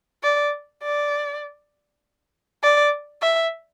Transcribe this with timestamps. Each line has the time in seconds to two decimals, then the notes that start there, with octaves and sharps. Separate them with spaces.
0.23 D5
0.83 D5
2.63 D5
3.22 E5